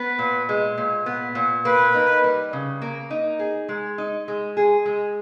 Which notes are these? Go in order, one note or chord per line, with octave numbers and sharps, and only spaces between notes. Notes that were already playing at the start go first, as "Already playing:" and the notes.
Already playing: B3 B4
A#2
G#3
A#2
B3
A#2
A#3 B4
D#4
G3
C#3
A#3
D#4
G#4
G#3
D#4
G#3
G#4
G#3